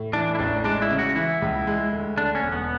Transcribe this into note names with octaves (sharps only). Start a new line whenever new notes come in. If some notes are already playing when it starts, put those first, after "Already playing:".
Already playing: A2
E3 D4
E4
A1 D4
G#3 D4
E4
C#3
F#4
E3 E4
C#2
G#3
D2
D3 D4
C#4
E1
B3